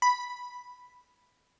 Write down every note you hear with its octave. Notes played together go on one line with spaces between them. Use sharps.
B5